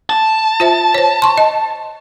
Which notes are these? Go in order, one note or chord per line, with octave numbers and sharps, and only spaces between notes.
A5
F4 C5 E5
C5 C#5
C6 C#6
D#5